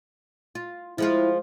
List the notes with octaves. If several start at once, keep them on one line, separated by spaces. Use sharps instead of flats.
F4
F3 G#3 E4 F4